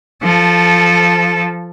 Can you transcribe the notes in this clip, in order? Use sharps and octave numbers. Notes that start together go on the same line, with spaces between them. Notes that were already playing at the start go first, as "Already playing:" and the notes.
F3 A4